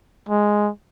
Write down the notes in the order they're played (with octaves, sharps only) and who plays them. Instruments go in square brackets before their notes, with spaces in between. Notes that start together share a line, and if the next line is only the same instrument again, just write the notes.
[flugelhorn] G#3